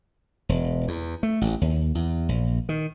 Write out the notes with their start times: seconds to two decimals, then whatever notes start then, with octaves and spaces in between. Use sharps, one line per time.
0.49 E1
0.88 E2
1.23 A3
1.41 A1
1.61 D#2
1.95 E2
2.29 A#1
2.69 D#3